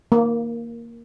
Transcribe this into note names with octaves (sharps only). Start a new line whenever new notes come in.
A#3